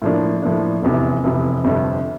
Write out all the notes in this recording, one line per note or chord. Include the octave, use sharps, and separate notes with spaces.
A2 F3 A#3 D4
A2 F3 A#3 D4
F1 E2 C3
F1 E2 C3
G1 F2 C3